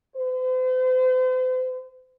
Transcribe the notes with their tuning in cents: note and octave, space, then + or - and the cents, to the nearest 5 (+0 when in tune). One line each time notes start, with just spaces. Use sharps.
C5 -40